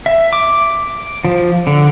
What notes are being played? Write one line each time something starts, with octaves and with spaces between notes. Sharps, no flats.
E5
D6
F3
D3